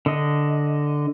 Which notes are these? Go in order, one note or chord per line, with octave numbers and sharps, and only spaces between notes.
D3 D#5